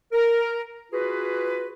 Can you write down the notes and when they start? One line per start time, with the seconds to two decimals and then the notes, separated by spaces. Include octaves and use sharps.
0.12 A#4
0.92 F4 F#4 G#4 B4